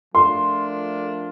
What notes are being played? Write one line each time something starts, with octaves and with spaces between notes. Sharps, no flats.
F3 A3 D4 F4 A#4 C6